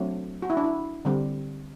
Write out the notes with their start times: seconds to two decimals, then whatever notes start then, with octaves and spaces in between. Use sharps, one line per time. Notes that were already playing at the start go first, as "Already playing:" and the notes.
Already playing: F#3 A3 C4 D4
0.42 F#4
0.50 E4
0.57 D4
0.64 E4
1.05 D3 G3 C4